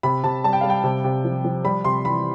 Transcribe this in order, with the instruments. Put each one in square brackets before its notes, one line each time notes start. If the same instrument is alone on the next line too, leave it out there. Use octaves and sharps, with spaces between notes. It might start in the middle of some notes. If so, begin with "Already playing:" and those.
[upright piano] C3 B5
C3 A5
G3 A5
G5
G3 F5
G5
C3
C3
F3
F3
G3 B5
C3 C6
E3 B5